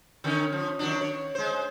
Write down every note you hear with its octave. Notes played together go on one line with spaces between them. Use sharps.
D3 D#3 C#4
F3
D#3 F#3 D4
C#5
G#3 C5